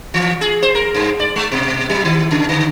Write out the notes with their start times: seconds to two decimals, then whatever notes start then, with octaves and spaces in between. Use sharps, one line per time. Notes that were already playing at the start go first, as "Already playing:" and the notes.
0.14 E3
0.41 G#4
0.62 C5
0.75 A#4
0.94 G2
1.20 D5
1.36 G#3
1.52 B2
1.90 F#3
2.04 D#3
2.31 C#3
2.49 D3